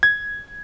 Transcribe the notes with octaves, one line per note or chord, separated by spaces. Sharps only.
G#6